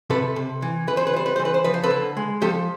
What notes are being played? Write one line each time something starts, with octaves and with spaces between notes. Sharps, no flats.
C3 A4 B4
C3
E3
E3 B4
C5
B4
G3 C5
B4
E3 C5
B4
C5
F3 B4
C5
A4 B4
D3
G#3
F3 G4 A4